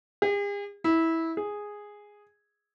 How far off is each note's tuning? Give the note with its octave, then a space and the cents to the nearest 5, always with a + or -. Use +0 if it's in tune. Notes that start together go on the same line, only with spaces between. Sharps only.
G#4 -45
E4 -15
G#4 -5